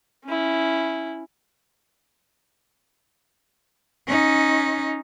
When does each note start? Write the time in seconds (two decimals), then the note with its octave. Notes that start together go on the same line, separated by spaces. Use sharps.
0.25 C#4 E4
4.07 C#4 D#4